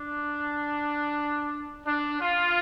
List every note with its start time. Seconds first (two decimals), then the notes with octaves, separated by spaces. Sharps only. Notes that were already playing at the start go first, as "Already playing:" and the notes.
Already playing: D4
1.85 D4
2.20 F4